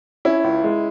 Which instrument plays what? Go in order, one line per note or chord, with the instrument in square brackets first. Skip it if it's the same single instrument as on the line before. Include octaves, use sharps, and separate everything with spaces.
[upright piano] C#4 E4
C#2
G#3